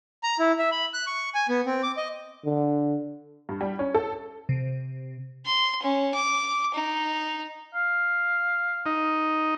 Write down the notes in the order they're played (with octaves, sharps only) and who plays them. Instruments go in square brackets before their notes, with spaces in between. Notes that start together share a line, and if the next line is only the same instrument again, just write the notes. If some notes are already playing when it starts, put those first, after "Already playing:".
[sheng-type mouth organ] A#5
E4
E5
B5
F#6
C#6
G#5
B3
C4
D6
D#5
[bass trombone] D3
[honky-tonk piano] G2
G3
C#4
A4
[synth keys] C3
[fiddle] C6
C#4
D6
D#4
[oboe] F5
[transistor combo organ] D#4